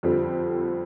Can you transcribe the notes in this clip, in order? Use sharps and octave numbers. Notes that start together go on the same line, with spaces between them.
F2 D3 G3 C4